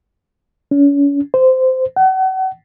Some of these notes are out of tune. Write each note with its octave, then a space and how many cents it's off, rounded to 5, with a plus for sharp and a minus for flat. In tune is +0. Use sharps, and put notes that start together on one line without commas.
C#4 +35
C5 -15
F#5 +35